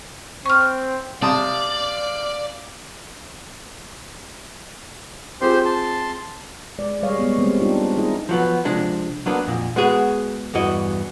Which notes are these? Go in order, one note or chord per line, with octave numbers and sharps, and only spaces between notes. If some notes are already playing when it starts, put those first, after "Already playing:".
C4 C#6 F6
C3 D5 F5 A5 D#6
C4 F4 G4 G#4 C5 C6
A5 C6
G#3 D5
G3 G#4 C#5 D#5 F5
G#3 B3
G3 G#3 A#3 C4 C5
G3 G#3 D4 D#4 F4 G4
D#4 E4 G#4 D#5
F3 F#3 B3
C3 F3 G#3 D4
F#3 A#3 B3 D4
F2 A#2
G#3 B3 F#4 G#4
E2 G2 E3 F#4 D#5